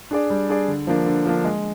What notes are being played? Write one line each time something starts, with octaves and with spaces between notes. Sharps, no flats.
D4 G#4 D5
G3
D4 G#4 D5
D3
F3 A#3 D4
D3
F3 A#3 D4
G#3